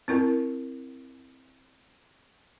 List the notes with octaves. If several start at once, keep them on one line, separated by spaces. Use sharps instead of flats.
C4 E4 A#4